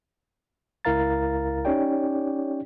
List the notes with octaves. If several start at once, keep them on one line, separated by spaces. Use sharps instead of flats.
C#2 E4 A#4 F5 A#5 A6
C#4 D#4 G4 C#5 D5 G5